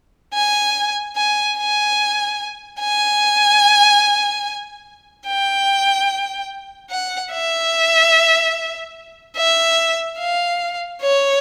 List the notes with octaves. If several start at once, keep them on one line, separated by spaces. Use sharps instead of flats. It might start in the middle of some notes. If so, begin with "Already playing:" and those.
G#5
G#5
G#5
G#5
G5
F#5
E5
E5
F5
C#5